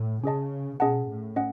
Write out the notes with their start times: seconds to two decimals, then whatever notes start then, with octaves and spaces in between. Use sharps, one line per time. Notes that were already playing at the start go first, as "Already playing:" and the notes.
Already playing: A2
0.24 C#3 C#4 G#4 D#5 A5
0.80 B2 C#4 G#4 D#5 F#5 A5
1.09 A2
1.36 C#4 D#5 F#5